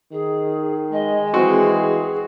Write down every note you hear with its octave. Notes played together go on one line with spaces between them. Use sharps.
D#3 G#4
G#3 D#5
E3 C4 F#4 G#4